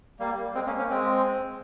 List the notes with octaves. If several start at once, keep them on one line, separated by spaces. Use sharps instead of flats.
G3 A#3
G#3 C4
A#3 C#4
A#3 C#4
G#3 C4